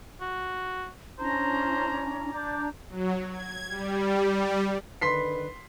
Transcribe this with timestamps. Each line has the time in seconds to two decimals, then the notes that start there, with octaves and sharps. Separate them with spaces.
0.21 F#4
1.19 C#4 D4 E4 C5 A#5
2.34 D4 D5 A#5 G6
2.89 F#3
3.29 G#6
3.68 G3
4.30 G3
5.01 D3 D#3 B4 C6 B6 C7